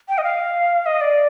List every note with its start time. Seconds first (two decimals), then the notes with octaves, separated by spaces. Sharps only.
0.09 G5
0.18 D#5
0.24 F5
0.86 D#5
1.01 D5